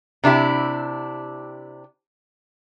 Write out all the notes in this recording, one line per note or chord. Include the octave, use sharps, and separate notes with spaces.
C3 D4 E4 G4